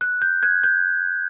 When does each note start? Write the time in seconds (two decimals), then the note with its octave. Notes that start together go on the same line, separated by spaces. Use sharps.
0.01 F#6
0.22 G6
0.43 F#6 G#6
0.64 G6